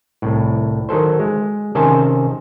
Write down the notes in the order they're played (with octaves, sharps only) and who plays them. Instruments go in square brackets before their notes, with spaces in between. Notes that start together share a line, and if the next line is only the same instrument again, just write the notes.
[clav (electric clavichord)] C2 A2
D#3 F#3 A4 C5
G#3
C3 D#3 C#4 C5 G#5 A5